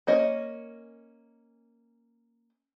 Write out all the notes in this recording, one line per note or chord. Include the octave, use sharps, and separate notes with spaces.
A#3 C#4 D#5